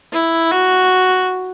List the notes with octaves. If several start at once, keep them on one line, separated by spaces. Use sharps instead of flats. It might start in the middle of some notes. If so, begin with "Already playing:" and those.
E4
F#4